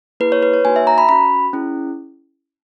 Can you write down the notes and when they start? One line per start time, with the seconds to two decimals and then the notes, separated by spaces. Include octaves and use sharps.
0.20 A#3 E4 G#4 B4
0.32 C#5
0.43 B4
0.54 C#5
0.65 A#3 D#4 F#4 G#5
0.76 E5
0.87 A#5
0.98 B5
1.09 C#4 F#4 B5
1.53 C#4 E4 G#4